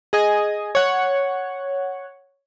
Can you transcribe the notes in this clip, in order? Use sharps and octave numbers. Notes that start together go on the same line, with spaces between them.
G#4 D#5 G#5
C#5 F#5